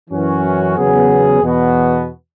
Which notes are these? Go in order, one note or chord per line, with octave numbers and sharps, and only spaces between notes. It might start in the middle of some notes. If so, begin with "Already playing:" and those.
F#2 E3 C#4 F#4
E2 C#3 F#3 B3 G#4
E2 B2 B3 F#4